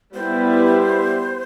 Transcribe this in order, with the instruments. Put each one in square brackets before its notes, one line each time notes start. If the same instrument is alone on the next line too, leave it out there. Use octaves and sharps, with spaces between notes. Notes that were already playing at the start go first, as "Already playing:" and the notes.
[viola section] G3 B3 E4 B4 [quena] C5